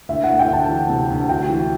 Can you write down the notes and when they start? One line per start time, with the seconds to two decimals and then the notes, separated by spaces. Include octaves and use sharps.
0.09 D2 E5
0.24 F#5
0.29 D2
0.39 G5
0.49 D2 A5
0.68 E3
0.89 C3
1.10 D2
1.29 F#4 G5
1.49 E3